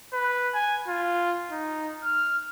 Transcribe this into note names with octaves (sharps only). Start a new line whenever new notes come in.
B4
G#5
F4
D#4
F6